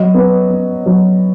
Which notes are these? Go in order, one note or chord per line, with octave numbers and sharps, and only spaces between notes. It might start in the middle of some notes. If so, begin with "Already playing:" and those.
Already playing: F#3 D#5
B3
B3
F#3